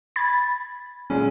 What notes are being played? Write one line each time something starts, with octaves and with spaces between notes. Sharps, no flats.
B5 G#6 A6
A#2 F#3 G#3 C#4